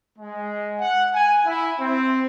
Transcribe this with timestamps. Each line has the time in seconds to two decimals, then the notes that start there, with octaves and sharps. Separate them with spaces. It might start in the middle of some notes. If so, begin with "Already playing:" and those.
0.19 G#3
0.80 F#5
1.14 G#5
1.45 E4
1.80 C4